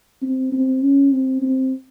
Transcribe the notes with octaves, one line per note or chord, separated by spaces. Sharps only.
C4
C4
C#4
C4
C4